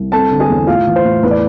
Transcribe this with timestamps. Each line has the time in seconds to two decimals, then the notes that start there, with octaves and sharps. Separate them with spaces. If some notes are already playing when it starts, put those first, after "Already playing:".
Already playing: C2
0.12 C4 A4 A5
0.31 D3
0.40 G#4 G#5
0.50 E2
0.67 A2 F4 F5
0.87 E3
0.96 C5
1.05 A2
1.23 E2 B4
1.31 D5